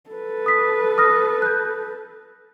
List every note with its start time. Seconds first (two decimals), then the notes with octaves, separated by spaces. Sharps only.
0.10 A4 B4
0.46 D#6 B6
0.98 D#6 F6 A#6
1.42 F#6 G6